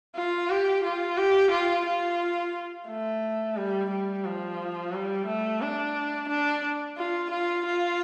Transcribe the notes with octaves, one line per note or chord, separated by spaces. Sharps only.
F4
G4
F4
G4
F4
F4
A3
G3
G3
F3
G3
A3
D4
D4
F4
F4
F4